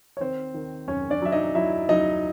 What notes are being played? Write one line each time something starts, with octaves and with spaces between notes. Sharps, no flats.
C#5
D#3 C4 C5
D#3
F#2 C#4 C#5
D4 D5
F#3 E5
D#4 D#5
F#3 E4 E5
F#3 D#4 D#5